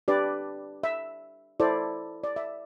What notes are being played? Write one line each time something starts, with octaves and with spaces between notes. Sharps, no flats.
D4 G4 B4 D5
E5
E4 A4 C5 D5
D5
E5